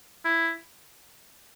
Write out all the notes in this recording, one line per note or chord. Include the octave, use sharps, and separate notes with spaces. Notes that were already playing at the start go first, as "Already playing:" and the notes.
E4